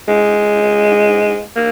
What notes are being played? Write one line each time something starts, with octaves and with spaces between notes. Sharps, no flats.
G#3
A#3